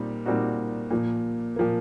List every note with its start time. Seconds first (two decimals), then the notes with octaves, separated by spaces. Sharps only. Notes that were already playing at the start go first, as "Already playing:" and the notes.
Already playing: A#2 G3 C4 D#4
0.25 A#2 G3 C4 D#4 F#4
0.91 A#2 F3 A#3
1.56 A#2 F3 A#3